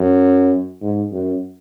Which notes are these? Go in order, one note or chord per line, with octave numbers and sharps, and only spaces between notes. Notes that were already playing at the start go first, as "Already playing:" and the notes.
Already playing: F#2
G#2
F#2